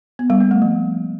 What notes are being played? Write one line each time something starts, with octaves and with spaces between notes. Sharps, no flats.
B3
G3
A#3
A3
F3